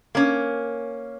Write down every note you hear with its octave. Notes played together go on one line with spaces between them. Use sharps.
A#3 C#4